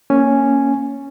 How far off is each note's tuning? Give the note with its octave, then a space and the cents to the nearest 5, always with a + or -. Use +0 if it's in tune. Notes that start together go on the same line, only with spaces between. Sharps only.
A#3 +0 C#4 +0 G#5 +0